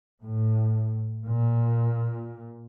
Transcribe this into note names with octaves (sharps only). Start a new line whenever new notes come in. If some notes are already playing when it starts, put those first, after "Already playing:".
A2
A#2